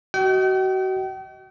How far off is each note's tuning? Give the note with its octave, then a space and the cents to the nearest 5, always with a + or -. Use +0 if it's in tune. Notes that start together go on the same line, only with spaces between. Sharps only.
F#4 +30 D#5 +20 G5 -40